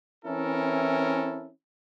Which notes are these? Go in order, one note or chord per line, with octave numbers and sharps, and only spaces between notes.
E3 C4 C#4 E4 A4 A#4